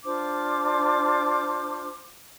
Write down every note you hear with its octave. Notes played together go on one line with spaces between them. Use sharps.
D4 F4 C5 D6